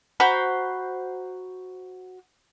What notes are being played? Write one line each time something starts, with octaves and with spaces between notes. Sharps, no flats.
F#4 C5 A#5 B5